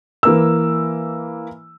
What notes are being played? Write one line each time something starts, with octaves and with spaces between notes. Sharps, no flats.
E3 A#3 E6